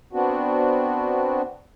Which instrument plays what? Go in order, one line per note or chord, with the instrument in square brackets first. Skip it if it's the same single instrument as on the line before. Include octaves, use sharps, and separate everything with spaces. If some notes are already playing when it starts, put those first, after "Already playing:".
[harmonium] B3 C4 D4 F#4